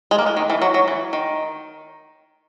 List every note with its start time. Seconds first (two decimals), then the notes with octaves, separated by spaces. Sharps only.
0.11 G#3
0.18 A#3
0.26 G#3
0.37 D#3
0.50 E3
0.62 F#3
0.74 F#3
0.88 E3
1.13 D#3